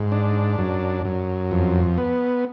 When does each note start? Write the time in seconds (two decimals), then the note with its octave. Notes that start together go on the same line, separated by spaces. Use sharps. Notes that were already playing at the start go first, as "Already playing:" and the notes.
Already playing: G#2
0.12 D4
0.58 F#2
1.05 F#2
1.51 F2
1.98 B3